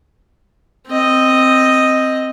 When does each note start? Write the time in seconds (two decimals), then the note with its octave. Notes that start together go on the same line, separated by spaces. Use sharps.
0.88 C4 D#5